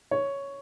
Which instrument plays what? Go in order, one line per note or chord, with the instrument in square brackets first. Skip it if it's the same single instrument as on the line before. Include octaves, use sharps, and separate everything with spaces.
[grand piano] C#5